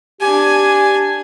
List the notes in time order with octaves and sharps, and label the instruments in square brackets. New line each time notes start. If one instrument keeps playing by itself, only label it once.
[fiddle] D4 G#5 [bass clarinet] G4